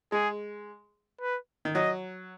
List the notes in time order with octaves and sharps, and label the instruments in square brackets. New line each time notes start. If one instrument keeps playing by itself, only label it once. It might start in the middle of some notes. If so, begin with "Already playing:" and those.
[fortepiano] G#3 [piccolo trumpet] G#4
[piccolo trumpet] B4
[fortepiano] D#3
[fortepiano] F#3 [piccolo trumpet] D#5